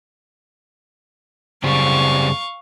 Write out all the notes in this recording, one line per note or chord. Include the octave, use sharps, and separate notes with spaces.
F#2 C#3 G3 C4 F5 C#6